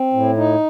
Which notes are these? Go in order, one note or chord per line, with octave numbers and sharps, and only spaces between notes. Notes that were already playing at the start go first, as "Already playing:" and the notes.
Already playing: C4
A2
D#4